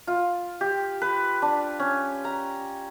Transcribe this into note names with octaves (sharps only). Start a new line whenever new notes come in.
F4
G4
B4
D4
C#4
A#5